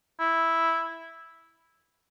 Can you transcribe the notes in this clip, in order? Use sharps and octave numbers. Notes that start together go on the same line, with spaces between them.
E4